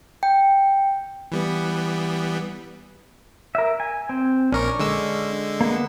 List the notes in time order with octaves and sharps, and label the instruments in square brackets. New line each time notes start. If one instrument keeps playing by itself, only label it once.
[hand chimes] G5
[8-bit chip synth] E3 G3 B3
[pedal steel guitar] A#4 E5
G#5
C4
[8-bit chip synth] A#1 A#4 [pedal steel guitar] C#4 D4 C#5
[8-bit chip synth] D3 G#3 E6
[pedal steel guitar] A#3 B3